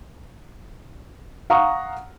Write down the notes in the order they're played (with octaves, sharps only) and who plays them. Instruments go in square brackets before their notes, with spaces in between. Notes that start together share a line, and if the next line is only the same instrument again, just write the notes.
[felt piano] F5 F#5 A#5 C#6 D#6